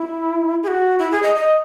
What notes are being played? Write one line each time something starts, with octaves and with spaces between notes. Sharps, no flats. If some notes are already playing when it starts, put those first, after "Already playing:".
Already playing: E4
G#4
F#4
E4
G#4
D#5
D#5